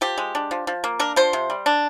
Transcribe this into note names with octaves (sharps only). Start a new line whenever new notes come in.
F3 G4
G#3
D4
F3
F3
A#3
D4 A#4
F3 C5
C3
G3
D4